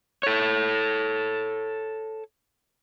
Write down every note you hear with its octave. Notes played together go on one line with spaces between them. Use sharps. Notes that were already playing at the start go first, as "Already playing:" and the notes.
A4 C#5